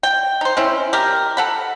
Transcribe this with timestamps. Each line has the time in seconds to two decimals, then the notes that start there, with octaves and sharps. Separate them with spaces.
0.03 G5
0.41 D#4 C5
0.57 C4 C#4 E4
0.93 G4 A#4
1.37 A4 F#5 B5